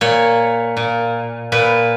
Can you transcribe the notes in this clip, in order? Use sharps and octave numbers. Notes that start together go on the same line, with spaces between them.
A#2 C#5
A#2
A#2 B4